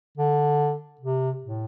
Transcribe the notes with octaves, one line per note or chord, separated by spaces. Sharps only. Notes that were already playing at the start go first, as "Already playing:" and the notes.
D3
C3
A2